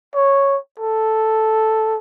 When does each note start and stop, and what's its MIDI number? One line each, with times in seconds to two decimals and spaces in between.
0.15 0.57 73
0.79 1.98 69